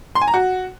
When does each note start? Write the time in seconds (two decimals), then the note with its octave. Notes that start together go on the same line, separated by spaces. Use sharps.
0.15 C6
0.22 G#5
0.28 A#5
0.34 F#4